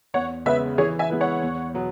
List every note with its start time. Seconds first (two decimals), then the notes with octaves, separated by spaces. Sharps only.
0.14 E2 C#5 F#5
0.46 C#3 G#3 B3 B4 E5
0.78 E3 G#4 C#5
0.99 E5 G#5
1.10 G#3 B3 E4 B4
1.21 C#5 F#5
1.42 E2
1.74 B2 F#3 B3